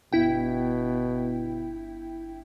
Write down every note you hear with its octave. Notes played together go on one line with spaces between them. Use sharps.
G1 B2 E4 G5